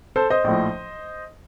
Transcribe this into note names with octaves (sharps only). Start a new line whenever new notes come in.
A4 C5
C5 D#5
A#1 A2 F3